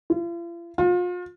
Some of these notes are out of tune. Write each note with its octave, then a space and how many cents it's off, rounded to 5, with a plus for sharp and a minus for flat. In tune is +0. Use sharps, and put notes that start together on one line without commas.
F4 -45
F4 +35